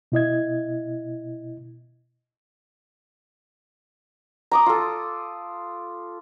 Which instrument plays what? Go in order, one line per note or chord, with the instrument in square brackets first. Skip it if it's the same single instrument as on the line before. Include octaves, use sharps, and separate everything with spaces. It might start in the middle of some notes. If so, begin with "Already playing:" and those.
[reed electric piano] B2 E4 D#5 G#6
[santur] A#5 D6 D#6
F4 A4